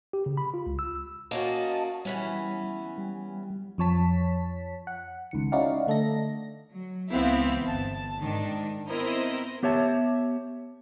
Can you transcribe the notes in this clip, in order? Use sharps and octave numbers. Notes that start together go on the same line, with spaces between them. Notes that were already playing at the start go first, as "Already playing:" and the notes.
G4
C#3
B5
F4
C#2
E6
A#3 C#4 F#4 D#5 A5
E3 G3 B3 C#4
G3
F2 F3 C#5 A5 B6
F#5
C#2 D#3 C#7
C#4 D#4 E4 F#4 D5 F5
D3 A3 A4 D#5 A#6
F#3
C#2 E3 B3 C4 E4 F5
G1 A5
G#2 D#3 D4
B3 C4 E4 A#4 C5 D#5
B3 G4 C#5 E5 A5